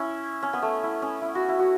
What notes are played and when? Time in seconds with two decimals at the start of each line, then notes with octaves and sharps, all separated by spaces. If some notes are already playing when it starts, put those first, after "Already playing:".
Already playing: C#4 E4
0.43 C#4
0.53 B3
0.62 A3
0.83 E4
1.02 C#4
1.21 E4
1.35 F#4
1.49 E4
1.59 F#4